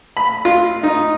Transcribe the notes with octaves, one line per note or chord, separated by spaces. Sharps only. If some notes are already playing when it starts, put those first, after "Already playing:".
B5
F4
D#4